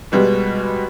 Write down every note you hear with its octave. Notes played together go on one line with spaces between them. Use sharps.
B2 G3 G#3 B3